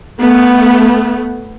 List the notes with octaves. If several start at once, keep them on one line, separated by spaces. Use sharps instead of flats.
A3 B3